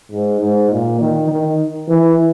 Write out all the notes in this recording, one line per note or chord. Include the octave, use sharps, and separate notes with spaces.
G#2
G#2
A#2
D#3
D#3
E3